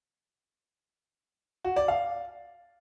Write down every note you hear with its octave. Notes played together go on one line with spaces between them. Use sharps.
F#4
D5
F5